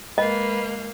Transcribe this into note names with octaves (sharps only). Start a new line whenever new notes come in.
G#3 A#3 B4 D#5